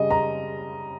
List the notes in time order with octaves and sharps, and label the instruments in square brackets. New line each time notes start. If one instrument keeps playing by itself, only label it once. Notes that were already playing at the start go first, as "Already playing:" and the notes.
Already playing: [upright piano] C#3 G3 D#5
A#5